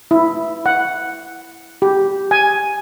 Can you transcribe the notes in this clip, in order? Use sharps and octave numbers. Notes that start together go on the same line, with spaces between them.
E4
F#5
G4
G#5